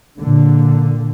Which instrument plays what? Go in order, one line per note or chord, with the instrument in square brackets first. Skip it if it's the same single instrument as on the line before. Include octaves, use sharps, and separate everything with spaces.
[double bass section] A#2 D3